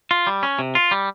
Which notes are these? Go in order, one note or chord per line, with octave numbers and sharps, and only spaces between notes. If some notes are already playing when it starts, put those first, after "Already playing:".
F4
G3
C#4
C3
F4
G3